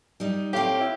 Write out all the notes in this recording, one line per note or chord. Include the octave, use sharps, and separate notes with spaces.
G3 D#4
A2 C4 G4 F5
E4